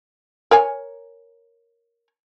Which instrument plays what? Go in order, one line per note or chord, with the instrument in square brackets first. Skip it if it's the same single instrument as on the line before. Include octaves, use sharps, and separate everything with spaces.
[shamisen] A#4 C#5 G#5